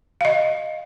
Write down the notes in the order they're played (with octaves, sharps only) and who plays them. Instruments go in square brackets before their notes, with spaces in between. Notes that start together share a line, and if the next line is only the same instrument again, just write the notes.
[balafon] D#5 F5